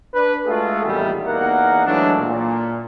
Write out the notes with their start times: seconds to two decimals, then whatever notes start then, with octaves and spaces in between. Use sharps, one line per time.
0.14 D4 B4
0.46 G#3 A3 F4 F#4 G#4 A4
0.84 A#1 E2 A2 D#3 G3 E5
1.26 E2 A#3 D#4 A#4 F#5
1.86 E3 F#3 G#3 A3 D4
2.19 A#2